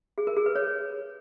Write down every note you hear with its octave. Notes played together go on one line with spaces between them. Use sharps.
G#4
A#4
G#4
B4
C#5